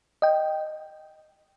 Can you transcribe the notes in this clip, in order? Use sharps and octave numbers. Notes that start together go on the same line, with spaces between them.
D#5 G5